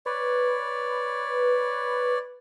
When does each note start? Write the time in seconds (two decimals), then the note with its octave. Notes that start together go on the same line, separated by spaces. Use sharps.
0.06 B4 C#5 D5